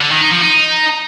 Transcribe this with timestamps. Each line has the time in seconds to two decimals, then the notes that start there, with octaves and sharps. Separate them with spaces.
0.01 D3
0.11 D#3
0.21 D#4
0.32 F3
0.42 D#4